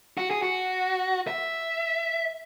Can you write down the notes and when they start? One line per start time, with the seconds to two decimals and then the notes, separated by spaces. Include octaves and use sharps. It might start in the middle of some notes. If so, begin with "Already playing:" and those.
0.18 F#4
0.31 G#4
0.42 F#4
1.27 E5